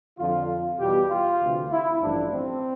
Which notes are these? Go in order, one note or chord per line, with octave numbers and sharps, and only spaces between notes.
F2 D3 F3 F4
E2 B2 G3 B3 G4
F4
D2 C3 E3
E4
A1 G2 F3 D4
C4